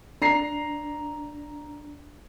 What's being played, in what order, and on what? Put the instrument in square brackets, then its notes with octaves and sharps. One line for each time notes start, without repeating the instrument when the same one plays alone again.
[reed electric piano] D4 [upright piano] A#5 C7